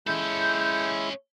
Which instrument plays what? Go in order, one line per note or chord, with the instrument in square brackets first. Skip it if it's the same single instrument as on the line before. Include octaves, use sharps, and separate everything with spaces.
[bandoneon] G#3 E4 [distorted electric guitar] C#4 A4 [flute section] G6